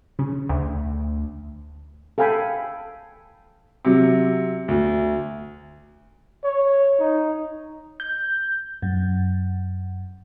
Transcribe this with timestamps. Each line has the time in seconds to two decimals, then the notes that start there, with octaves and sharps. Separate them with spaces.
0.19 C#3
0.49 D2
2.18 A4 F5 G5 G#5 B5
3.85 C3 F#3
4.68 D2
6.44 C#5
6.99 D#4
8.00 G6
8.82 F#2